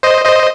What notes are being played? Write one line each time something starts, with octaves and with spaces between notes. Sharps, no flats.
C5 D#5
C5 D#5